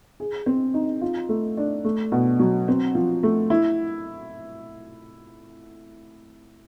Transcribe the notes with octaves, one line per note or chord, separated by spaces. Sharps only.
G#4
C4
D#4
F4
A3
D4
A3
B2
F#3
C4
F3
A3
E4